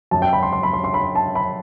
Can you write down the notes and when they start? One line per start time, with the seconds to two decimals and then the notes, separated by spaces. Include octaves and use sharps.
0.11 F#2 F#3 A5
0.22 G5
0.33 B5
0.42 C6
0.52 C6
0.63 B5
0.73 C6
0.84 C6
0.94 B5
1.15 A5
1.35 B5